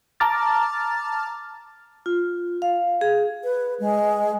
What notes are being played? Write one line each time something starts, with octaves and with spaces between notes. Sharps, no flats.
A5 A#5 D6 F6 A6
F4
F5
G#4
B4
G#3